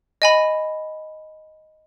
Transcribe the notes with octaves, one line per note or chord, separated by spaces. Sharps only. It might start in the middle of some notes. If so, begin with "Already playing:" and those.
D#5 G#5 B5